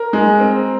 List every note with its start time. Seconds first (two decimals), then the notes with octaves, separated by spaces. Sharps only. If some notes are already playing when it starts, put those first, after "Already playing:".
Already playing: A#4
0.13 G#3
0.40 C4